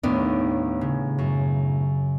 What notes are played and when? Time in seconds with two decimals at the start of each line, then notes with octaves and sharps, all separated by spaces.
0.03 D#2 A2 B3 D4
0.81 C#3
1.18 F#2